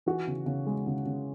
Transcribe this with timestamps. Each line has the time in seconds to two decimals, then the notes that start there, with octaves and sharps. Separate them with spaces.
0.06 E3 F#4
0.27 C#3
0.46 C#3
0.66 G#3
0.87 C#3
1.06 C#3